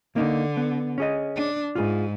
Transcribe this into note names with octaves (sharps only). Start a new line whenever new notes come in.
D3 A#3 D#4
B3
C#4 G#4 D#5
D4
G#2 F4 G#4